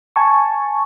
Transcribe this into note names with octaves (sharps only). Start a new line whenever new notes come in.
G#5 A5 C#6